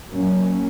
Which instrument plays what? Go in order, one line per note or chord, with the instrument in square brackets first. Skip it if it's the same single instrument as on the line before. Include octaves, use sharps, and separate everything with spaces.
[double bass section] A#2 F#3 A#3 C#4